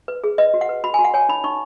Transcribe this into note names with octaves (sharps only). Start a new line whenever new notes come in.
B4
G#4
B4 D#5
F#4
F#5
B4
F#4 B5
F#4 G#5
F#5
C#5 G#5
D#4 B5
D#4 C#6